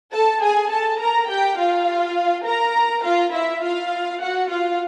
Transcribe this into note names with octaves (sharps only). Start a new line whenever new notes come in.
A4 A5
G#4 G#5
A4 A5
A#4 A#5
G4 G5
F4 F5
A#4 A#5
F4 F5
E4 E5
F4 F5
F#4 F#5
F4 F5